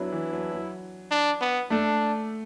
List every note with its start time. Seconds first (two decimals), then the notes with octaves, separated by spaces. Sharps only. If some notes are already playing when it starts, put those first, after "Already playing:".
Already playing: F#3 B3 D4 E4
0.12 E3
0.32 F#3
0.52 F#3
1.11 D4
1.41 B3
1.70 A3 D4